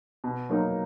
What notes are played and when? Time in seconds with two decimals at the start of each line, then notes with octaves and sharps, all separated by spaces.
0.24 B2
0.49 F#3 A#3 D#4